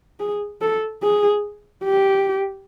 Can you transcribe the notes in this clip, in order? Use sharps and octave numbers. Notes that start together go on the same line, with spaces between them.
G#4
A4
G#4
G4